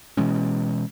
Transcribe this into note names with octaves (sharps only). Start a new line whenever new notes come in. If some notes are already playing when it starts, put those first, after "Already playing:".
B2 E3 G#3 C#4